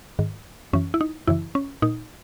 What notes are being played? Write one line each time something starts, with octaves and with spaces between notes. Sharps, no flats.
G#2 D#3
F#2 E3 C#4
E4
D#4
F#2 C#3 E3 E4
C#4
A#2 D#4